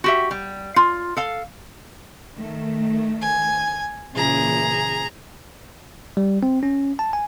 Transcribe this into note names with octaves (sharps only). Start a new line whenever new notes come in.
F#4 G4 E5
G3
F4
A4 F5
D#3 A3
G#5
A#2 C#3 E3 G#4 A#5
G3
C4
C#4
A5
G#5